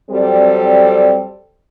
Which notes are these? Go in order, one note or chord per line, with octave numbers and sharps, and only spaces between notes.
F2 F#3 G3 C4 A4 D5